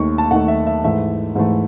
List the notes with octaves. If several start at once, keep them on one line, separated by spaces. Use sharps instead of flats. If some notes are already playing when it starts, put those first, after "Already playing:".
Already playing: D#2 D#3 A3 C#6
A5
D#2 D#3 A3 F#5
E5
E5
G#2 E3 A3 E5
G#2 E3 A3